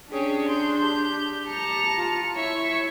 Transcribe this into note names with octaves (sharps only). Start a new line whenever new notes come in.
C#4 D4 G4 G#4
C6 G6
G4 G6
A5 A#5 C#7 F7
F4
E4 C#5 E5 C#6